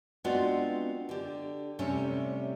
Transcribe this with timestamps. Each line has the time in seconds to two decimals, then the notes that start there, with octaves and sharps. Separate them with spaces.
0.24 G#3 B3 C4 D4 F4 F#4
1.09 D3 G4
1.79 A2 C3 G3 A3 C#4